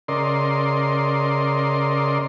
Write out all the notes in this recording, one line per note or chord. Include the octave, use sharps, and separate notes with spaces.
C#3 A#4 D5 D#5 C6